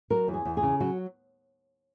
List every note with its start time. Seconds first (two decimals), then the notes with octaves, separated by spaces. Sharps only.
0.10 F#3 A#4
0.28 E2
0.34 G#4
0.45 E2
0.57 G#4
0.63 C#3
0.80 F#3 F#4